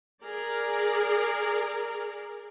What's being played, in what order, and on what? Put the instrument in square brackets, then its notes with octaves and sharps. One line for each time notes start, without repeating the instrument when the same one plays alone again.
[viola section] G#4 A#4 D5